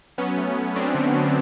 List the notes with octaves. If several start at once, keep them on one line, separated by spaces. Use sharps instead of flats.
F#3 B3 C#4
A3
F#3
F#3 C4 D4
D3
F#3